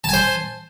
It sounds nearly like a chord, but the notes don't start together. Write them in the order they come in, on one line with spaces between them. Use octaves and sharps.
A5 G#5 C5